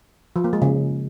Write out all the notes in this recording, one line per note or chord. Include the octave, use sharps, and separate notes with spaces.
F3
A#3
G#3
C#3